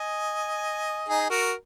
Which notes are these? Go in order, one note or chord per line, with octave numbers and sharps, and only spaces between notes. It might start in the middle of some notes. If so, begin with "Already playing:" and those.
Already playing: D#5 G#5
D#4 G#4
F#4 A#4